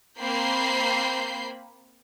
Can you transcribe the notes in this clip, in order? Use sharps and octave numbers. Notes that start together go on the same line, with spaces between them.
A#3 C4 B5 G6 C7